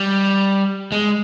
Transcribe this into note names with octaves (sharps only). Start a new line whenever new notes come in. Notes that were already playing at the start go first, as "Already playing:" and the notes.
Already playing: G3
G#3